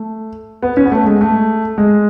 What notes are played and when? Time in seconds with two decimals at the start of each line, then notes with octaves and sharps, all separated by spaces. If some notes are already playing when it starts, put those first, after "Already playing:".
Already playing: A3
0.63 B3
0.77 C#4
0.85 B3
0.92 A3
1.06 G#3
1.21 A3
1.78 G#3